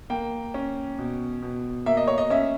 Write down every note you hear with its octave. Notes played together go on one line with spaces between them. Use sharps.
A#3 G5
C#4
B2
B2
A#3 E5
D#5
C#5
D#5
C#4 E5